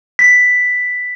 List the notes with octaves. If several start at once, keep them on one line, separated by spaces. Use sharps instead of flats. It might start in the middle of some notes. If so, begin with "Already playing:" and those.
B6